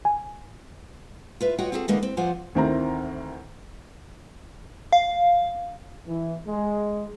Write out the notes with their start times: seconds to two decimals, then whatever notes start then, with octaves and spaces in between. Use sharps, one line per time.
0.05 G#5
1.41 F4 B4 E5
1.58 F4 F#4 C#5 D#5 F#5 G5
1.72 C4 F4 F#4 G#4 A4
1.88 D3 E3 G#3 A#3 B3 D#4
2.03 C4
2.17 F3 F4 C5 D5 F#5 G#5
2.55 D2 D#3 C4 E4 A#5
4.93 F5
6.07 E3
6.47 G#3